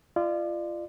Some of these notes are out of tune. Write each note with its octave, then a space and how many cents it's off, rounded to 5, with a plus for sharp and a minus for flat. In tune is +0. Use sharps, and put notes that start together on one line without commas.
F4 -25 D5 +35